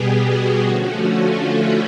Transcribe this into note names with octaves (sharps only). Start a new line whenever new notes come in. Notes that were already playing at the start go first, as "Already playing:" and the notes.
Already playing: B2 G3 B3 G4 G#4
F#4
D3 F3 A3 C#4 F#4
F4
E4